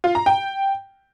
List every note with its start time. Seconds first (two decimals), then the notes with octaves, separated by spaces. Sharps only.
0.04 F4
0.15 A#5
0.26 G5